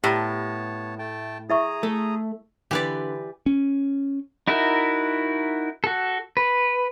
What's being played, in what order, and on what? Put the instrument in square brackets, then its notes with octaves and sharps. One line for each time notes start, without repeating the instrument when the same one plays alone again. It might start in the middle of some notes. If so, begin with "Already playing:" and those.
[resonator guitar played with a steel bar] A2 [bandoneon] B3 C#5 A5 [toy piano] G4 A#5
[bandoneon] A3 G5 A5
[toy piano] E4 E5 C#6 [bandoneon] G#4 A#5 D#6
[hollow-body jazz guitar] A3
[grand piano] D3 [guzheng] E3 [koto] G4 B4 D5
[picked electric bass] C#4
[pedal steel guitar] D#4 E4 F#4 A#4 E5
F#4 A4
B4